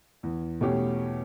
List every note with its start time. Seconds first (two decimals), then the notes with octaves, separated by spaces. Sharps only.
0.23 E2
0.61 B2 A3 C#4 G4